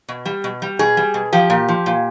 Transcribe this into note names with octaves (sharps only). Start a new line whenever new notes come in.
B2
G3
B2
G3
B2 G#4
G3
B2
F3 G4
A#2
F3
A#2